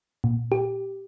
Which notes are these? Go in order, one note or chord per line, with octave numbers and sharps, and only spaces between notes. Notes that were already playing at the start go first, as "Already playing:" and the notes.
A#2
G4